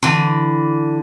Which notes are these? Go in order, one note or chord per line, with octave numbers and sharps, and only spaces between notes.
D3 E3